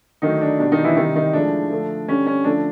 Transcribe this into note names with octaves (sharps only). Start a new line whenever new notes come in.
D3 D#3 F#3 A3 D#4
D4
B2 G3 D4
D#3 D#4
E3 E4
C3 D#3 G3 D#4
D#3 D#4
A2 F3 G#3 D4
D3 F3 A3
D3 G3 C#4
C#4
D3 F3 A3 D4